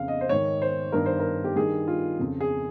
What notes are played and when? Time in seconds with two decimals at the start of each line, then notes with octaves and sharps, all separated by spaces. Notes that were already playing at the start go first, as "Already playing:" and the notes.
Already playing: F2 C#3 F5
0.08 D#5
0.21 C5
0.29 G#2 D#3 C#5
0.62 C5
0.92 G2 D#3 A#4
1.06 C5
1.20 A#4
1.44 G4
1.56 G2 D#3 G#4
1.88 F4
2.19 F2 C#3
2.41 G#4